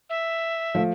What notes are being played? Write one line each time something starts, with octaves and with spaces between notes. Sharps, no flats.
E5
F3 A3